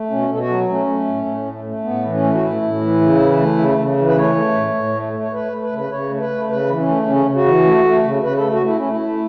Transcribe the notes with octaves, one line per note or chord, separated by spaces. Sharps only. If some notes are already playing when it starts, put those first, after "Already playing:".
Already playing: A3
B2 C#4
B2 A4
F#4
F#3
A3 C#4
A3
A2
A2
A3
A3
A2 B3
E3
C#4
A3
F#4
A2 E4
A2
E3
C#3
E3
A3
C#3
C#3
E3
B4
A3 C#5
A3
A2
A2
A3
A3
C#5
A3 B4
A3
B4
C#3
B4
C#3 C#5
A3
B4
A3
C#3 B4
E3
C#4
A3
C#3 C#4
C#3
F#4
E3
A3
A3
C#3
C#3 B4
A3 A4
F#4
A3 E4
A3 C#4
E4
A3